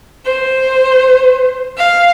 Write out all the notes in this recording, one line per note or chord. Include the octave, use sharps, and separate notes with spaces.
C5
F5